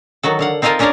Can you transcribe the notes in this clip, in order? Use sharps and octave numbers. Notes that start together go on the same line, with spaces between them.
D#3 F#3 F#4 A4
D3 F5 F#5
C4 D#4 F4 A4 A#4 G#5
C#4 D4 G#4 A#4 C#5 D5